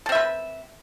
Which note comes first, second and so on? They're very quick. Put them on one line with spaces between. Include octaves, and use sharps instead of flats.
A4 C4 E5 B4